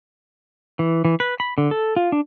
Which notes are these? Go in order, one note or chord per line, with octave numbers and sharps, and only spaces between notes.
E3
E3
B4
B5
D3
A4
F4
D4